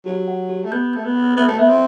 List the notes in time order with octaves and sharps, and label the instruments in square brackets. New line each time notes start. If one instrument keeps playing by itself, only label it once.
[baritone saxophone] F#3 [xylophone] G4
[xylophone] F#5
G4
[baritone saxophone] A3
[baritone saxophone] B3 [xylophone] G6
[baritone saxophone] A3 [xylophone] G6
[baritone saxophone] B3
[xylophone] F#5
[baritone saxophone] B3 [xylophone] E5
[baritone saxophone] A3
[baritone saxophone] B3 [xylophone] E5
[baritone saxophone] C4